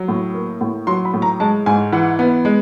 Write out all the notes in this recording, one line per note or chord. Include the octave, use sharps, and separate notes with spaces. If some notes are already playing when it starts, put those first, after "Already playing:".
Already playing: F#3
A2
A#3
A2
F#3 C6
B5
A2
A#5
G#3 A5
G#2 G#5
E3 F#5
B3
G#3